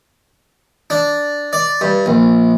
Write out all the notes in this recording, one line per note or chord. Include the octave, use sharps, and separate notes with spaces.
D4
D5
G2
A#1